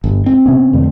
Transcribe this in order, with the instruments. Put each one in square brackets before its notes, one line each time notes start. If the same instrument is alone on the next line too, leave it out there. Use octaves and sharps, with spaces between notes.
[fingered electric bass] G1
C4
[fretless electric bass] C3 B3 C#4
F2 D3 A3